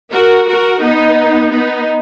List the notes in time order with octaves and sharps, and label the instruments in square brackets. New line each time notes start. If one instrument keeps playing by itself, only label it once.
[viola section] F#4 A#4
F#4 A#4
B3 D#4
B3 D#4